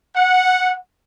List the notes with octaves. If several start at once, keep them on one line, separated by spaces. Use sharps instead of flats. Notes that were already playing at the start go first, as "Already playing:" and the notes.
F#5